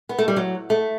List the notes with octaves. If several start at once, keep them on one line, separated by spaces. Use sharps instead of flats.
B3
A3
G3
F#3
A3